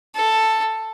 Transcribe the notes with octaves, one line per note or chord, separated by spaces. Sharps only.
A4